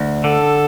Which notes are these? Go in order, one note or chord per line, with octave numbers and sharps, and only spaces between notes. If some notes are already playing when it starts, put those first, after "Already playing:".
Already playing: D2
D3 A4